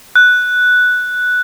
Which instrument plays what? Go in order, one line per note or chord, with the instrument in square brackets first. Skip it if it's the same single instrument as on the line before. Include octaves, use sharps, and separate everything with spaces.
[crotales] F#6